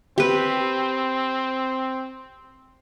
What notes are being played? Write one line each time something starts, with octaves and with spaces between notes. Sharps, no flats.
C4 G4 B4